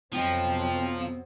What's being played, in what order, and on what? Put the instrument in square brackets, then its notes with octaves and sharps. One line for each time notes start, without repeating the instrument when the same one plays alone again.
[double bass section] F2 F#3 C4 [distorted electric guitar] F3 [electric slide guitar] B3 D#5 [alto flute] G5